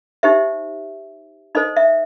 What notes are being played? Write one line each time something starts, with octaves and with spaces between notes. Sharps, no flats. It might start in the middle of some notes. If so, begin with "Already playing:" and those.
D#4 G4 C5 E5
D#4 A4 C5 D#5
E5